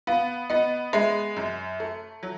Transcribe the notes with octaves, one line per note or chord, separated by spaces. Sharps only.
B3 F5
B3 D#5
G#3 E5
F#2
A3
F#3